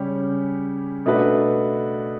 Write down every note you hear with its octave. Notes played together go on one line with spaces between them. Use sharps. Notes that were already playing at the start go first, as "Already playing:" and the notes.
Already playing: C#3 G3 C#4 G4
B2 A3 D4 F#4 B4